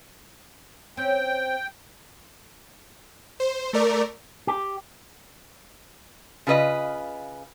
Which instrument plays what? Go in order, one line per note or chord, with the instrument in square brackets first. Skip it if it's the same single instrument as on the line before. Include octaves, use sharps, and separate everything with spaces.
[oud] C4 C#4 [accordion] G5
[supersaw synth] C5
A3 A#4 D5
[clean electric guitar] G4
[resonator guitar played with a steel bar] C#3 F4 B4 D#5